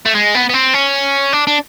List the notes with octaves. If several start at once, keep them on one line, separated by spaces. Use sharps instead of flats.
A3
G#3
B3
B3
C4
C#4
D4
D4